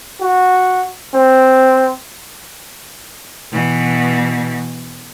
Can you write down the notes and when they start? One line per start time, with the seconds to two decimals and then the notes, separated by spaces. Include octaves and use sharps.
0.20 F#4
1.14 C4
3.52 B2 E3